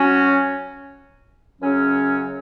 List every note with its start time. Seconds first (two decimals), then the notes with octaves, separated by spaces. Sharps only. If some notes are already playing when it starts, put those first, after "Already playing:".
Already playing: F#3 C#4 F#4
1.61 F#2 C#3 F#3 C#4